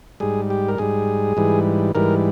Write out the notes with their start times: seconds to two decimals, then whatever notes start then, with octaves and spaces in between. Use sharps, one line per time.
0.20 G#2 G3 G#4
0.50 G4
0.68 A#4
0.78 G#2 G3 G#4
1.37 G#2 E3 G3
1.95 G#2 E3 G3 A#4